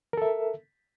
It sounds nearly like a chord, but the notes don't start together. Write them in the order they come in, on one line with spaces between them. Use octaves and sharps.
A#4 A4 E5